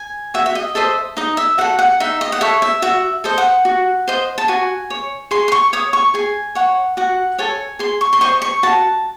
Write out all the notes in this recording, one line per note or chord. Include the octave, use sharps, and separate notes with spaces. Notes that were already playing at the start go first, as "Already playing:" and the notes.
Already playing: G#5
F#4 E5
E5
D#5
A4 C5 D#5 E5
D#4 D#5
E5
F#4 A4 F#5
F#5
D#4 E5
D#5
F#5
A4 C#5 E5
E5
F#4 E5
A4 C5 D#5
F#5
F#4
C5 D#5
A5
F#4 G#5
C#5
G#4 C6
C6
C#6
C#5 D#6
C#6
G#4 G#5
C#5 F#5
F#4 F#5
A4 C#5 G#5
G#4 C6
C#6
C6
C5 D#5 C#6
C#6
F#4 A5